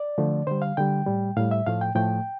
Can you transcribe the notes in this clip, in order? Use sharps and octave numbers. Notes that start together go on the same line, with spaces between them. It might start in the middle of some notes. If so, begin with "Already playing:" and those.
Already playing: D5
D3 F3 A3
D3 G3 C5
F5
D3 G3 G5
A2 G3
A2 G3 F5
E5
A2 F3 A3 F5
G5
A2 F3 A3 G5